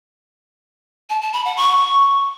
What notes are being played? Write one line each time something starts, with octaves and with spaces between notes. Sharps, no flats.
A5
A5
B5
F#5
C#6